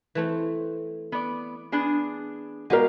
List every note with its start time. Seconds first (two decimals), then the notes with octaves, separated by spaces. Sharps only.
0.15 E3 A3 C4
1.12 B3 D5
1.72 B3 D4 G#4
2.70 G#3 B3 F#4 G4 A#4 F5